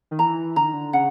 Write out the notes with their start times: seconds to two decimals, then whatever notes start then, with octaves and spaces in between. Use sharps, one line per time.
0.11 D#3
0.19 E3 A#5
0.56 D3 A#5
0.65 D#3
0.73 D3
0.93 C#3 F#5